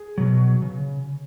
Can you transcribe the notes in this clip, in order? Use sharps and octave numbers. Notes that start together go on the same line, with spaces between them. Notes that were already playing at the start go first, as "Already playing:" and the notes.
Already playing: G#4
B2 F#3
C#3